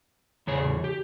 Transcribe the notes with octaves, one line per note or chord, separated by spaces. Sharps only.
E2 C#3 C#5
G4